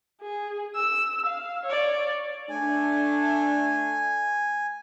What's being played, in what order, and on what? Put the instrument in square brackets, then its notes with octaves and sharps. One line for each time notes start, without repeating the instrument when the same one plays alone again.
[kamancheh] G#4
E6
F5
C#5 D5
[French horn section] A3 D4 [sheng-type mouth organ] G#5